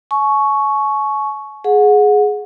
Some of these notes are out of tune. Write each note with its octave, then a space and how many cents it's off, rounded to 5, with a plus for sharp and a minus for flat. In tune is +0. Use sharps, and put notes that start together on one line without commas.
G#5 +45 C#6 +0
G#4 +10 F#5 -25